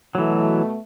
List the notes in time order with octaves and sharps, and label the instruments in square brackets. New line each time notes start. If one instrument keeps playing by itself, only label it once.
[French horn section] B2 A3 [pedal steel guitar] E3 F#3